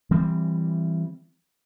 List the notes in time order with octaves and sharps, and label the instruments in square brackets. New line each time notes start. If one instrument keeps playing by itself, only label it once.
[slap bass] E3 G3 C4